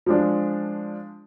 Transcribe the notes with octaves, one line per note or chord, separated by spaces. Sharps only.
F3 G#3 D4